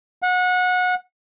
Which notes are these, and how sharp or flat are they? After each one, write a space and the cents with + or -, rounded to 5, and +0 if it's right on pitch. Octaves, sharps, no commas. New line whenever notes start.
F#5 -25